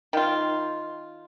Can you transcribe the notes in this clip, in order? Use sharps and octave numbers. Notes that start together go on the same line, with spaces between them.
D#3 F4